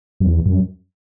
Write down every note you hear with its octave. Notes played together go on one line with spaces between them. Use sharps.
F#2
E2
F#2